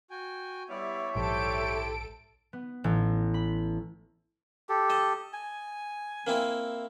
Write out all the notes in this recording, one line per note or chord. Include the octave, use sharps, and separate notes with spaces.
F#4 G5 G#5
G3 B3 E4 C#5 D5 E5
A#1 G#2 E4 G4 A4 C5 D7
B3
A1
B5
G4 A4
D#5 A5
G#5
A#3 C4 E4